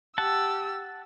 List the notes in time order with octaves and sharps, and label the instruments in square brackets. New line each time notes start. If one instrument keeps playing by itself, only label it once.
[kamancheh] G4 E6 [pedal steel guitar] F#5 A5